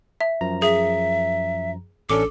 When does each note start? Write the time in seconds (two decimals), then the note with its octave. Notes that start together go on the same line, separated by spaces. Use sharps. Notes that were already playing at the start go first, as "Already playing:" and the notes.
0.21 E5
0.41 F#2 F3 A#5
0.62 G#4 E5
2.10 A1 C#4 D4 A4 D6